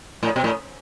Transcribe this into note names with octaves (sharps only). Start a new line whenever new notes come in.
A2
B2
A2